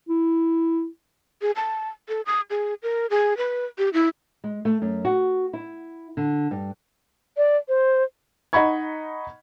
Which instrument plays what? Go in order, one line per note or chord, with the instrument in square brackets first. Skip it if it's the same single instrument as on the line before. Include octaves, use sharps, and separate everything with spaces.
[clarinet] E4
[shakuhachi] G#4
A5
A4
D#6
G#4
A#4
G#4
B4
G4
E4
[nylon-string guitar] G#3
A3
F#2
F#4
E4
D3
G2
[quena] D5
C5
[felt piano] D#4 D#5 F#5 B5 C#6 G#6